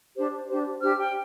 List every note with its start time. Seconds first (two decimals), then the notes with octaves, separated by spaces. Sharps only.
0.15 D4 G4 C5
0.47 D4 G4 C5
0.81 D4 G4 C5 F6
0.97 G5